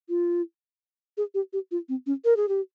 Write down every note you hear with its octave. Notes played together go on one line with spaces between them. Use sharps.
F4
G#4
G4
G4
F4
C4
C#4
A#4
G#4
G4